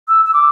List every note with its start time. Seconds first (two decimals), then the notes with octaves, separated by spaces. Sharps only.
0.08 E6
0.25 E6
0.34 D6